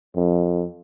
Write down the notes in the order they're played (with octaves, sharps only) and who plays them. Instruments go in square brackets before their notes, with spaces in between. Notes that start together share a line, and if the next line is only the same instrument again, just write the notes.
[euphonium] F2